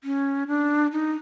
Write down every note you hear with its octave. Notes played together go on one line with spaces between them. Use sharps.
C#4
D4
D#4